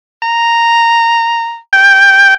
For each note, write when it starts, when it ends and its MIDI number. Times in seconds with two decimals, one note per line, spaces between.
0.22 1.58 82
1.73 2.34 79